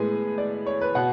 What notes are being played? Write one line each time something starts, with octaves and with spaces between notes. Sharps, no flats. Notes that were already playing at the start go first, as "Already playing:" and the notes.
Already playing: A2 G#3 B3 G#5
D5
C#5
B4
B2 F#5